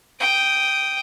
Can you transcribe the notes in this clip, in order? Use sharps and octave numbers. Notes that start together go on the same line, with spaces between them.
G5 D#6